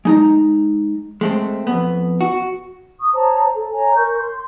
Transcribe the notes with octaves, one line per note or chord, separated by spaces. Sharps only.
G#3 D#4 A#5
G#3 A3 C4
F2 B3
F#4
C#6 D#6
C5 C#5 A5 A#5
A4
C#5 G#5 A#5
A#4 C#6 G6
C6